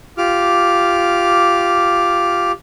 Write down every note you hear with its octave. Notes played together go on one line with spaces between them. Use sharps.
F4 G4 D6 F6